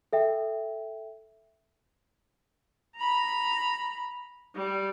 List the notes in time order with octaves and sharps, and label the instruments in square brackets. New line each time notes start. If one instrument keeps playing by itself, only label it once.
[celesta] A4 E5 G5
[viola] A#5 B5
G3